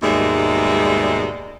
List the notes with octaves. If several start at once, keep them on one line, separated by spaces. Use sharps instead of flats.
D#2 G#2 B2 G3 G#3 E5